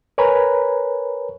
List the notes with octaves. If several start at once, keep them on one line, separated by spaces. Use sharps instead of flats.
A#4 B4 C#5 G#5 A#5 B5